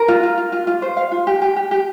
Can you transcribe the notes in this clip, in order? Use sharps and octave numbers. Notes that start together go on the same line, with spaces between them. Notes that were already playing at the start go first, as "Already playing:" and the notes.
Already playing: A#4
F4
F4
F4
F4
F4
C5
F5
F4
G4
G4
G4
G4